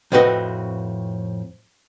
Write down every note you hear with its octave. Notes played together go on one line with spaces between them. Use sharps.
F2 A2 C4 F#4 B4 D#5